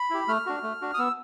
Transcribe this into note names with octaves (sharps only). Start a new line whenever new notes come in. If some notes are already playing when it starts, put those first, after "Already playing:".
Already playing: B5
E4 G4
A3 F6
D4 F#4
A3
D4 F#4
D#6
B3 E6